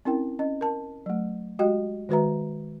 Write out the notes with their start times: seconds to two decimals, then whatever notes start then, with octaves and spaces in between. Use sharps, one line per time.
0.05 C4 C#4 E4 A#4 G5
0.39 C#4 D#5
0.61 A#4 A5
1.06 F#3 A3
1.59 G#3 F#4 G4 D#5 G5
2.09 D#3 G#3 F#4 B4 E5 A#5